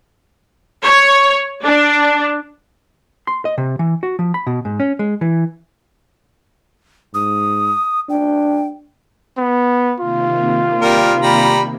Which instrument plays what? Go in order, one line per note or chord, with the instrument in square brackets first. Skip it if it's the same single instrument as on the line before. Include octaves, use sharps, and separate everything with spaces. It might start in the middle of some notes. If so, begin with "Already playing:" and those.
[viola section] C#5
D4
[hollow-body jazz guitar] C6
D#5
C3
E3
F#4
F3
B5
B2
G#2
C#4
G#3
E3
[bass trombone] G#2 [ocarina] D#6
[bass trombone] D4 [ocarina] G5
[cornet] B3
[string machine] C3 D#3 A#3 [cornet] F4
[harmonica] G3 A#4
G3 A#5 B5